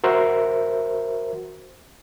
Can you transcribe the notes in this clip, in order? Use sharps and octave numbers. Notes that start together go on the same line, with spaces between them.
F#4 A#4 C5 E5